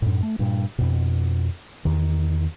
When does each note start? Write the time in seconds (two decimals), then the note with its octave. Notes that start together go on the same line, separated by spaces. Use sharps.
0.02 F#2 A2
0.23 A3
0.39 G2 A#2
0.78 F2 B2
1.85 E2 D#3